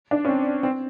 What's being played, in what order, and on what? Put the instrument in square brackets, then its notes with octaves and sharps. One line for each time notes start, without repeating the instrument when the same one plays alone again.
[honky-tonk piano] D4
C#4
C4
C4